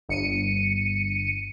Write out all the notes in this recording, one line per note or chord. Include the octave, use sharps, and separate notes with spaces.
G1 C#7 D#7